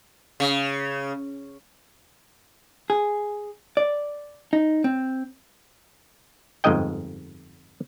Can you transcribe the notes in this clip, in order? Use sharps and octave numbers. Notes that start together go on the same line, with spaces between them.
C#3
G#4
D5
D#4
C4
G1 F2 G#2 G#3 D#5 G5